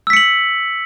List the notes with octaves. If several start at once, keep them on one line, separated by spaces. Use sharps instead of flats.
E6 B6 C#7 F#7